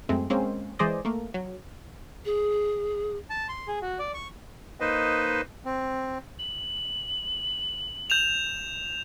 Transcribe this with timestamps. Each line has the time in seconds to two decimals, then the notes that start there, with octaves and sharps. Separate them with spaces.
0.09 F#2 G#3 A3 C4
0.30 G#3 A#3 C4 C#4 C5
0.79 E3 G#3 G#4 C5 D5 D#5
1.05 A3 A#3
1.34 F#3
2.25 G#4
3.30 A5
3.49 C6
3.67 G#4
3.82 F#4
3.99 D5
4.14 C#6
4.80 A#3 D#4 B4 C5 D#5
5.65 C4
6.39 F#7
8.10 G6 E7 F7